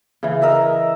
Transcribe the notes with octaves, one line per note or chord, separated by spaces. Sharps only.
C#3 E3
A#4 D#5 E5